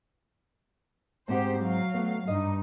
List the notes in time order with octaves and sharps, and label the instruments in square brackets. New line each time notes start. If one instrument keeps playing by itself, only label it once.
[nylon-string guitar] G#2 C4 F#5 [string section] G4 C5
[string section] F#3 F5
[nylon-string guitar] A3 B3
[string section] G2 D#4 [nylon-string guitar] D#5